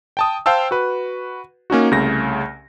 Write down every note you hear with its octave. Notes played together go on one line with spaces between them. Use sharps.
G5 A5 D#6
C5 F5 G5 A5 E6
F#4 B4
A#3 C#4 D#4 F#4
C2 C#3 A3 A#6